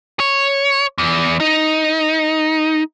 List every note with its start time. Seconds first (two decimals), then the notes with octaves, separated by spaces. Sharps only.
0.20 C#5
0.98 E2
1.40 D#4